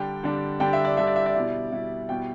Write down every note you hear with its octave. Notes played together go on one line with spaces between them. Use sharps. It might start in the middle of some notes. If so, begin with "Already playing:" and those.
Already playing: D3 G3 D4 G5
D3 G3 D4
D3 G3 D4 G5
E5
D5
D3 G3 D4 E5
D5
E5
D5
B2 G3 E4
B2 G3 E4
B2 G3 E4 G5